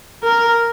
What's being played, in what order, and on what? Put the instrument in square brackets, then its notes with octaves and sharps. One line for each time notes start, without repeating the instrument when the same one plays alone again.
[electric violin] A#4